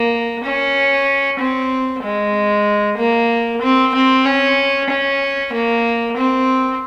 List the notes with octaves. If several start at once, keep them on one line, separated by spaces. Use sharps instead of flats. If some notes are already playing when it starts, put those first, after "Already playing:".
Already playing: A#3
C#4
C4
G#3
A#3
C4
C4
C#4
C#4
A#3
C4